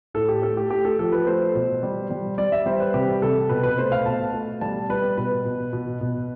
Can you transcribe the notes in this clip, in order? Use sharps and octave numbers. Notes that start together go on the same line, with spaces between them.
A2 A4
G4
A3 A4
G4
A3 G4
A4
F3 A4
B4
A3 C5
B2
G3
G3
G3 D5
E5
G3 C5
B4
C3 G4
C3 A4
B2 B4
B4
A3 C5
F5
B2 A5
A3
G3 A5
G3 B4
B2 B4
B2
B2
B2